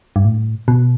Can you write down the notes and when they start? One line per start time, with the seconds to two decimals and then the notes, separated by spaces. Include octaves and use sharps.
0.16 G2
0.25 A2
0.68 B2